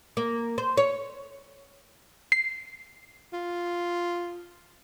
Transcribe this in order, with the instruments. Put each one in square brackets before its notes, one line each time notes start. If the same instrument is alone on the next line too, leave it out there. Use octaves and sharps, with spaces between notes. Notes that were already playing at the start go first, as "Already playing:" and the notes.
[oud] A#3
C5
C#5
[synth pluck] C7
[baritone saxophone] F4